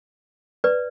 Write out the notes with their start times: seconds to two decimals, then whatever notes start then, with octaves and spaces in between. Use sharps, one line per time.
0.64 B4 D5